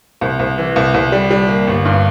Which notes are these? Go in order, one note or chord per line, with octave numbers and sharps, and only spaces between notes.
C2
C2
E3
C2
C2
G3
G3
A#3
G1
G2